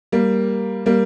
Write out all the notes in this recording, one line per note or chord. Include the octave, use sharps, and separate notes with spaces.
G3 A#3
G3 A#3